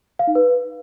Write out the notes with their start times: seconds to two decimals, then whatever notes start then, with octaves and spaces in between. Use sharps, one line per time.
0.19 F5
0.27 D#4
0.35 B4